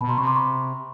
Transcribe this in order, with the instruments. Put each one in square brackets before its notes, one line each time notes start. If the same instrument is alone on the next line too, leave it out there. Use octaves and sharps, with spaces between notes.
[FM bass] B2 [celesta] A5 B5
[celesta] A#5 C6
[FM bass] C3 [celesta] B5 C#6
[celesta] C6 D6
B5 C#6